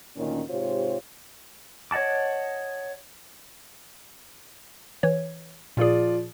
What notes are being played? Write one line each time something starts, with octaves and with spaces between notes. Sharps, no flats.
D2 A#2 D#3 C#4
G#2 C3 F4 G4 C5 C#5
C#5 D#5 F#5 A5 D6
E3 C#5
A#2 F3 F4 G#4 D5